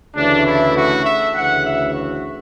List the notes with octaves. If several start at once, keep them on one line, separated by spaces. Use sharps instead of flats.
D2 C#3 E3 A3 D4
E4
F#4
E5
D2 C#3 E3 F#5
E5
F#4